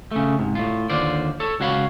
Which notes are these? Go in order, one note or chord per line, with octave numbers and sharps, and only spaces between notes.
C#3 A3
G#2 C3
A2 C3 F4
D#2 D3 F4 C5 D5
A4 C#5
C#2 F#4 C#5 F5 A5 B5